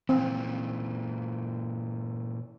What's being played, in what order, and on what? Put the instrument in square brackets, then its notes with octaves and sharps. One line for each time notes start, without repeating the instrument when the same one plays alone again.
[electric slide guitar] A#2 E3 [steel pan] C4